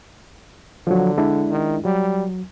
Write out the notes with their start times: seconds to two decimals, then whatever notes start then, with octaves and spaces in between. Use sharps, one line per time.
0.87 D3 F3 F#3
1.18 G#3 D4 E4
1.50 D#3
1.85 F#3 G3